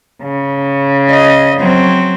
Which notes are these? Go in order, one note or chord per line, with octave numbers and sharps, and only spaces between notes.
C#3
D#5
F#3 C4